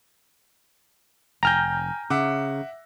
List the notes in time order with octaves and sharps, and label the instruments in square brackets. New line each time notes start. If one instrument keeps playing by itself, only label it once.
[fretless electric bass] F1 [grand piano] G5 G#5 A#6 [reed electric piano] A#5 F6 G6
[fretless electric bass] C#3 [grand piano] E5 F#5 D6